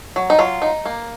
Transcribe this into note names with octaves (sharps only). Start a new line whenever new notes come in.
F#3
D#4
F#3 F4
D#4
A#3